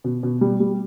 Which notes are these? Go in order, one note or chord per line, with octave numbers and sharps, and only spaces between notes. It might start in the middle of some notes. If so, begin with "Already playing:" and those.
B2
B2
G3
G3